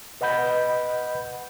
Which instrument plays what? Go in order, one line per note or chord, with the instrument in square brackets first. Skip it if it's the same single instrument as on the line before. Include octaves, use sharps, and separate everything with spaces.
[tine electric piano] B4 D#5 F#5 B5 G6